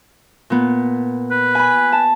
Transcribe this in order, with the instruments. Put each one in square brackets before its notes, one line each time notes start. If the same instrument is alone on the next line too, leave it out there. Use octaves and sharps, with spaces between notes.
[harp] A#2 B3
[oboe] B4
[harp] G#5 B5
A5